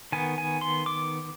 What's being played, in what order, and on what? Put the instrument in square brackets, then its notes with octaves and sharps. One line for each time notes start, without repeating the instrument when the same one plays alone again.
[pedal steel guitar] D#3 B3 G#5
G#5
C6
D6